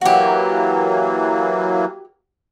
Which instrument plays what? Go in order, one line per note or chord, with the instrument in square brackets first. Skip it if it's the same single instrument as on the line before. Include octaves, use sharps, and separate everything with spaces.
[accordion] E3 F#3 A#3 [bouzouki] F#4 G4